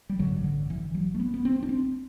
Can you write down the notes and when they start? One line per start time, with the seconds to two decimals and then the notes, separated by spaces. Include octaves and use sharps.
0.09 G3
0.19 A1 G2 D3 F#3
0.44 D3
0.70 E3
0.95 F#3
1.15 A3
1.20 B3
1.34 B3
1.45 C4
1.63 D4
1.69 C4